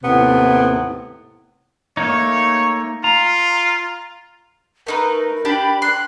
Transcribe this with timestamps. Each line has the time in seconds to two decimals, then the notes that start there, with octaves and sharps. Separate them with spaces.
0.02 D#2 A2 C3 B3
1.97 A3 A#3 D#4 C#5
3.04 F4 A#5
4.87 A3 D#4 A#4 B4
5.45 D4 G4 D5 B5
5.82 C6 F#6